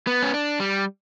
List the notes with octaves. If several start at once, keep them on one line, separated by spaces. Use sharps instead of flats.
B3
C#4
D4
G3